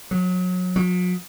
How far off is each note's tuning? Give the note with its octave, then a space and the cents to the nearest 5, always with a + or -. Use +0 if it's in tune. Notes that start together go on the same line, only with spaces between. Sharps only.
F#3 -30
F#3 -45